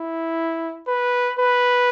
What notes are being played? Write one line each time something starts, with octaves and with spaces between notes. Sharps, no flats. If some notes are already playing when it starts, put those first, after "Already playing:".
Already playing: E4
B4
B4